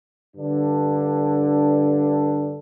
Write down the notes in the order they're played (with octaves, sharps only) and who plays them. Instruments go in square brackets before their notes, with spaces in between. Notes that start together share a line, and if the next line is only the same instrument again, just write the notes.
[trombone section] G2 D3 D4